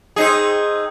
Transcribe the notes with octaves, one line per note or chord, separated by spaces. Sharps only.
C4 D#4 G#4